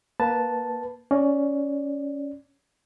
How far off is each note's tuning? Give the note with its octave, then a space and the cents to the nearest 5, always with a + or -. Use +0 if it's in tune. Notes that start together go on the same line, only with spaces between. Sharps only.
A#3 +15 B4 +0 A5 +0
C#4 +10 D5 +0